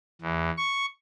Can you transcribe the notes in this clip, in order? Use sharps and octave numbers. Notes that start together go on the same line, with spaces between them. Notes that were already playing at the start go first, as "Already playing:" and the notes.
E2
C#6